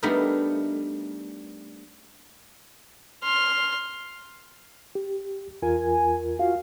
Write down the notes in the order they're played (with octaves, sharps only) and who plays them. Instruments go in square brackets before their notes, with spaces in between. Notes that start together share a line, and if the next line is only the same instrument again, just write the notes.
[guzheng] G3 A3 B3 D4 D#4 A#4
[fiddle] C6 F6
[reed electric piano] G4
[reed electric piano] E2 F4 A#4 [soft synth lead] G#5
[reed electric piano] F4 F#4 [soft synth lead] F5